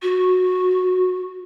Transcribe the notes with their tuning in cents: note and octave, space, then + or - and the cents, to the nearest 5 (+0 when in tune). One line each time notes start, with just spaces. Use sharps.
F#4 -15